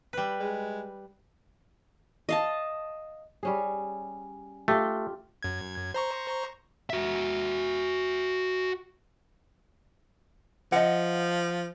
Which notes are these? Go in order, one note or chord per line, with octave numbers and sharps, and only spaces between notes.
G3 B4
G#3
D#5 F5 A5
G3 C#4 G#4
A3 F4 G4
F#2 G#6
C5 A#5 C#6
F#4 E5
F3 D#5 F#5